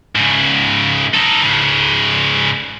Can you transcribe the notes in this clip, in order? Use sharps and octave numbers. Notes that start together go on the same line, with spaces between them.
G#2 C#3
D#4 A4
G#2 C#3